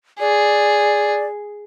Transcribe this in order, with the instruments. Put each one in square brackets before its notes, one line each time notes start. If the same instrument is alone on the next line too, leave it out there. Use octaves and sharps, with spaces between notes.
[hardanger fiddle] G#4 [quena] D5